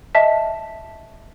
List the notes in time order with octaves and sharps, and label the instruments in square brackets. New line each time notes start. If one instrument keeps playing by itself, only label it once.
[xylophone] D#5 E5 A5 B6